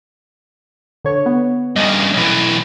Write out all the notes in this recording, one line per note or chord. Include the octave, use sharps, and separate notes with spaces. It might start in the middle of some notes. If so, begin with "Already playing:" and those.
D3 C#5
B3
G2 C#3 D#5 A#6
B1 E3